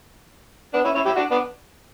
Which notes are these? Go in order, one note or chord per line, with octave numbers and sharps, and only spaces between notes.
B3 D4
C#4 E4
C#4 E4
E4 G4
D4 F#4
B3 D4